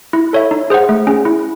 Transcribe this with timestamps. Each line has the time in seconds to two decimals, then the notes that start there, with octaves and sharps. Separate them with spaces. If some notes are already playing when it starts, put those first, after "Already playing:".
0.13 E4
0.33 A4 C#5 E5
0.51 D#4
0.70 G#4 C5 F#5
0.89 A3
1.07 C#4 G#4
1.25 E4